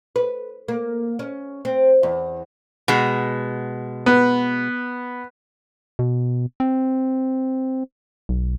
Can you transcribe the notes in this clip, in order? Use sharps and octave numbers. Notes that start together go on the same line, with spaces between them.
B4
A#3
C#4
C4
E2
B2 G#3
B3
B2
C4
B1